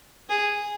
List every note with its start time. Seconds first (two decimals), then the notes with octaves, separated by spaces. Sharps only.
0.29 G#4